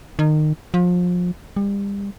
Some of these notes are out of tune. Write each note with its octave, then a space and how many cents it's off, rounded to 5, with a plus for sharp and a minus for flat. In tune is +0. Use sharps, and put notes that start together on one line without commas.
D#3 -25
F3 +30
G3 +35